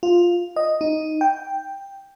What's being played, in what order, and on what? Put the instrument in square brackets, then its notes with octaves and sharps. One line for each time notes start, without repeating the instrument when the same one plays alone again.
[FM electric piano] F4
D#5
D#4
G5